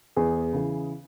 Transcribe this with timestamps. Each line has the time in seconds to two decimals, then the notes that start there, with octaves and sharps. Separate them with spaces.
0.16 E2 G#4
0.53 C#3 E3